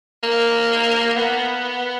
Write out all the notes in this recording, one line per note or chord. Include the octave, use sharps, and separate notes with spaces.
A#3
B3